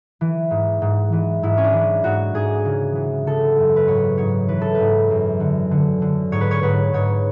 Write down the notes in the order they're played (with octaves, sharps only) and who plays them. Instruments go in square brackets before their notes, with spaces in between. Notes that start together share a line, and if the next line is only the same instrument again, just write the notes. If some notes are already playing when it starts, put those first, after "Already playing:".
[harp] E3
G#2
G#2
E3
G#2 E4
C#4
D4
E3
G#2 F#4
G#2 G#4
C#3
E3
C#3 A4
F#2
B4
G#2 C#5
G#2 C#5
E3 B4
A4
B4
G#2
F#2
D3
D3
D3
G#2 C#5
B4
C#5
G#2 B4
G#2 C#5